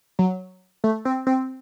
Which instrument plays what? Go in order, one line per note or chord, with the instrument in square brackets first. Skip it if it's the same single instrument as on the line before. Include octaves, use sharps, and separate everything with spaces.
[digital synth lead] F#3
A3
C4
C4